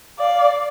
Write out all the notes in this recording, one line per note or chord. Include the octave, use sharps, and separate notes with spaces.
D5 F5